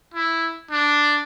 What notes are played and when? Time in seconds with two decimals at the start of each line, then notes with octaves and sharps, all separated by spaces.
0.14 E4
0.71 D4